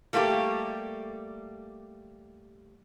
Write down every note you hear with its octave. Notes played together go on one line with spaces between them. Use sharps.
G3 A3 A#3 F#4 G4